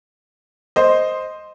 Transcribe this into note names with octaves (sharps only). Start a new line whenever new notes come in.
C5 D#5